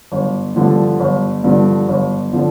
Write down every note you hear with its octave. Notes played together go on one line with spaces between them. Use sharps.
G1
G2 D3 F3
G1
G2 D3 F3
G1
D3 F3